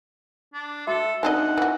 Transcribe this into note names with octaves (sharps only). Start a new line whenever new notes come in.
D4
F#4 A4 E5
C4 D4 D#4 D#5 F#5
E3 F#4